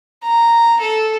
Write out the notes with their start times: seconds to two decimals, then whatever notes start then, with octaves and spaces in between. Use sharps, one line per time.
0.23 A#5
0.80 A4